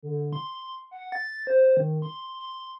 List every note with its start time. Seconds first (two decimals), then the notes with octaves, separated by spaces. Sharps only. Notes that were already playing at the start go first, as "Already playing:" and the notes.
0.03 D3
0.33 C6
0.91 F#5
1.12 A6
1.47 C5
1.77 D#3
2.02 C6
2.40 C6